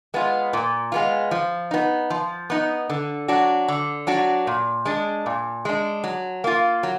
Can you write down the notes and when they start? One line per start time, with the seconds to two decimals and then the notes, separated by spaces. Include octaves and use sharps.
0.14 G#3 B3 F4
0.53 A#2
0.92 G#3 B3 F4
1.31 F3
1.71 B3 D#4
2.10 F3
2.50 B3 D#4
2.90 D3
3.28 F#3 D4 F#4
3.68 D3
4.07 F#3 D4 F#4
4.47 A#2
4.85 G#3 D4
5.26 A#2
5.65 G#3 D4
6.04 F#3
6.44 A#3 F4
6.83 F#3